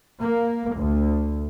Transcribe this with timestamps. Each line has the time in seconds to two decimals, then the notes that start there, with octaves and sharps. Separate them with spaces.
0.21 A#3
0.77 D2